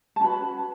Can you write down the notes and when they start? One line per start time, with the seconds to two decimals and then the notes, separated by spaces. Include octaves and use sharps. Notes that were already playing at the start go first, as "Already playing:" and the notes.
0.16 A5
0.21 C#4 F#4 B4 B5